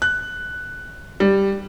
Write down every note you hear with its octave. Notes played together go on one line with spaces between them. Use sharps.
F#6
G3